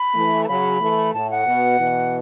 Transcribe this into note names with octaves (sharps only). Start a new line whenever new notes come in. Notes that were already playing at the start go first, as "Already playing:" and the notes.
Already playing: B5
E3 A3
A5
C#3 F#3 B5
E3 A3
A2 A5
F#5
B2
B2 E3